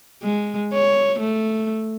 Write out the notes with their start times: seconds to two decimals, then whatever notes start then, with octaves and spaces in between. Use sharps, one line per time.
0.23 G#3
0.73 C#5
1.20 A3